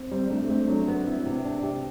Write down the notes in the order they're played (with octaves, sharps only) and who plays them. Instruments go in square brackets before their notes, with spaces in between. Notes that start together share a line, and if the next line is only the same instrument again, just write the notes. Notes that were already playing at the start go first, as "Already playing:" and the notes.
Already playing: [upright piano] C4
[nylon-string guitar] G3 [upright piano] C4
[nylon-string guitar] A3 [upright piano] D4
[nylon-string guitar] A3 [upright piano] C4
[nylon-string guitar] F#3 [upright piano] D4
[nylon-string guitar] B3 [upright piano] C4
[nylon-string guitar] E4
C3
D4
G4